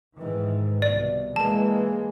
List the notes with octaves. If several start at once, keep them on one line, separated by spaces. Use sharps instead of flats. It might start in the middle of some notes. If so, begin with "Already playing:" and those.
G#2 D#3 E3
C2 B2 D5
E3 G#3 A#3 A5